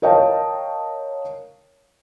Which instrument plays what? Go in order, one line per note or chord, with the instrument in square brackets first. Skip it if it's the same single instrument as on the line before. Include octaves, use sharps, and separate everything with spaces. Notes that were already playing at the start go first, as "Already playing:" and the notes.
[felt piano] A#4 C#5 D#5 F5 G5 A5